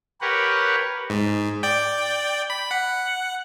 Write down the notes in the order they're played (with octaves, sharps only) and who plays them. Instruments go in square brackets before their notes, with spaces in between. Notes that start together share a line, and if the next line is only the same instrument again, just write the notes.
[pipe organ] G4 A#4 B4 C#5 F#5
[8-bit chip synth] G#2
D5 G5
B5
F#5